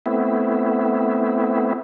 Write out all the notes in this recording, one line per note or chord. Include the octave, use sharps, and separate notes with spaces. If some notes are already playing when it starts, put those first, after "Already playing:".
A3 B3 C4 E4